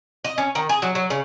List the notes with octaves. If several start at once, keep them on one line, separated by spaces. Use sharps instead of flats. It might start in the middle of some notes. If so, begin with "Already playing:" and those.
D#5
C#4
D#3
G#4
F#3
F#3
C#3